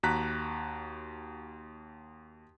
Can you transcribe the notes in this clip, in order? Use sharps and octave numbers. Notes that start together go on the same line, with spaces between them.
D#2 F#4 A5 A#5 F#6 B6